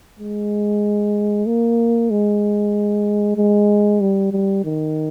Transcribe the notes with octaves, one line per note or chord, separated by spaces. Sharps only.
G#3
A#3
G#3
G#3
G3
G3
D#3